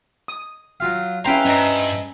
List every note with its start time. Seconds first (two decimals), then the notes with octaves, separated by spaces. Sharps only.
0.28 D#6
0.80 F#3 F4 F5
1.25 C#4 E4 B4 C5 F5 G5 A#5
1.45 G2 C#4 D#5 A#5